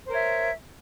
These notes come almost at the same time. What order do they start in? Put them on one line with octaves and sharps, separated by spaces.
C5 A#4 C#5 E5